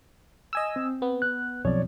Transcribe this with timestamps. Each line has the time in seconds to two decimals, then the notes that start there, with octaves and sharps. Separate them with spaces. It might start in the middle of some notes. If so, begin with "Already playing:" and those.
0.53 D#5 G#5 E6
0.76 C4
1.02 B3
1.22 F#6
1.65 B1 F2 C#5 D5